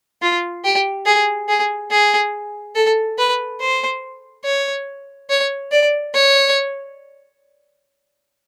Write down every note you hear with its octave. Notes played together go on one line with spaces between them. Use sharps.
F4
G4
G#4
G#4
G#4
A4
B4
C5
C#5
C#5
D5
C#5